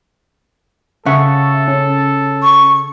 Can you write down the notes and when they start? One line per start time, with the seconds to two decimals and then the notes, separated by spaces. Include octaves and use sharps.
1.06 C#3 A4 E5 F#5 C#6
1.68 C#4
2.43 C#6